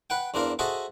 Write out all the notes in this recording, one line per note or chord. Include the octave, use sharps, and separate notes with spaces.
B4 F#5 G5
E2 C4 D4 A#4 C5 F5
F#4 G#4 A4 C5 D#5 E5